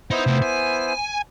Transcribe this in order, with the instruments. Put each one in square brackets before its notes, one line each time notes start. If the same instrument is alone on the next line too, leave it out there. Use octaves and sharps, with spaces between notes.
[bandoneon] B3 E4 C5 [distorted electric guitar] D#4
[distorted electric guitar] C3 A3
G#5